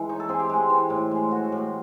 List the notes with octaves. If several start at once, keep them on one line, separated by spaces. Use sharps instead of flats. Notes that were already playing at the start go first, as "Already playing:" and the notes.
Already playing: E3 G#3
D#4 C#5
A4
C4 G#4
G4
G#3
E3
A2
G#3
E3 F#4
F#4
A2
G4